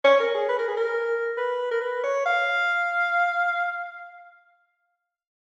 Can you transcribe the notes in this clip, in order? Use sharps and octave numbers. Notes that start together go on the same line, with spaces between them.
C#5
A#4
G#4
B4
A#4
G#4
A#4
B4
A#4
B4
C#5
F5